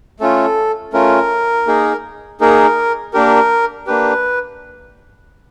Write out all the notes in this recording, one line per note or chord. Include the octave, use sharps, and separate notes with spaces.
A3 C#4 F4 A4
A3 C#4 F4 A#4
A#3 D#4 G#4
A#3 D#4 G#4 A#4
A#3 D4 G4 A#4
A#3 D4 G4 B4